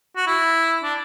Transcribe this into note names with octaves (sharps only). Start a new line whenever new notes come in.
F#4
E4
D4